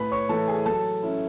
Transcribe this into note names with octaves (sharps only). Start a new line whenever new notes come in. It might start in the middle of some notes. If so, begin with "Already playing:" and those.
Already playing: A2 B4 B5
C#5 C#6
E3 A3 A4 A5
G#4 G#5
F#3 A4 A5
C#4 E4